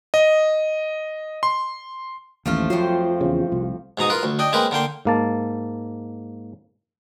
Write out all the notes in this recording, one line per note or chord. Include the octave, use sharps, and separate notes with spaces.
D#5
C6
A1 D#2 F3 A3 F4
F2 F#3 F4 C5
E2 C#3
C2
G#2 B2 A#5 D#6
F4 A#4 B4
D2
D4 D#5 G5
G#3 A#3 C4 A#4 B4
D3 A#3 G5 C6
G#2 A#3 A5